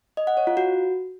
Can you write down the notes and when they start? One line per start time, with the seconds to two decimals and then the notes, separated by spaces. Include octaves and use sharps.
0.17 D#5
0.27 F#5
0.37 C#5
0.47 F4
0.57 F#4